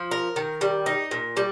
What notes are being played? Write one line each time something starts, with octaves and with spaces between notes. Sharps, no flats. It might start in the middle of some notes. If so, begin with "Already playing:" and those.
Already playing: F3
A#4
D#3
G3
D#4
A#2
G3